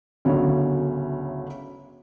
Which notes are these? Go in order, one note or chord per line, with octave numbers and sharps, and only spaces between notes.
G1 D2 A2 C#3 F#3 C#5